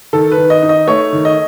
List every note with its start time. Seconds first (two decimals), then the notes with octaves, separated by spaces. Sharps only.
0.13 D#3 A4
0.32 B4
0.37 D#3
0.50 D#5
0.63 D#4
0.69 D#5
0.87 A3 C#5
1.13 D#3
1.25 D#5